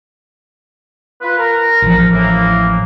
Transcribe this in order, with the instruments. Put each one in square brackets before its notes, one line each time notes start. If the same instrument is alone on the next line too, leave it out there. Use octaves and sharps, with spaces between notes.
[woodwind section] F4 B4
A#4
[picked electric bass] A1 F3
[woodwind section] A2 E3 A#3